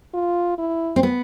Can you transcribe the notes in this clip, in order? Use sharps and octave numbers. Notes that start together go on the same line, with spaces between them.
F4
E4
C4
B3